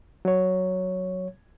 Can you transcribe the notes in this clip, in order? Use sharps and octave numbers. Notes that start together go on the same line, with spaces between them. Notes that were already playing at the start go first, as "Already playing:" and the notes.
F#3 C#5